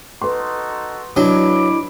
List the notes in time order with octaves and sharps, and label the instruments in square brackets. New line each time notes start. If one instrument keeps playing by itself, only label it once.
[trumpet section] D#4 F#4 A4 [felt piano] B4 C6
[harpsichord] F#3 [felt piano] D4 [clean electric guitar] E4 B4 D#5 [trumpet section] B5 D6